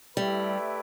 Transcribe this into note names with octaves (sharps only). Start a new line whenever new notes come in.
G3 A3 E4 G4 B4